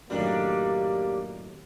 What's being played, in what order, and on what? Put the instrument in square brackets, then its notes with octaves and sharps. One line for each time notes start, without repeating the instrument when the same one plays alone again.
[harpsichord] F#2 A2 D#3 [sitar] G3 D4 [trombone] A#3